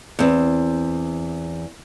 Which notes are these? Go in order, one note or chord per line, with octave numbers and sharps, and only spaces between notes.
E2 C4